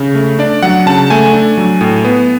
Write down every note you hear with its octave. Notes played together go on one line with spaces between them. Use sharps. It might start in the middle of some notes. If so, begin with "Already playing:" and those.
Already playing: C#3
A3
D4 D5
F#3 F#5
C#3 A5
A3 G#5
D4
F#3
A2
B3